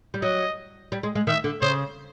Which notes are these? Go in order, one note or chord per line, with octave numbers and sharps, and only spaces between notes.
G3
F#3 D#5
G3
G#3
G#3
D#3 E5
D3
C#3 C5